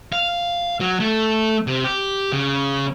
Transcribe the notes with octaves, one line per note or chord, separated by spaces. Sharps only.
F5
F#3
A3
C3
G4
C#3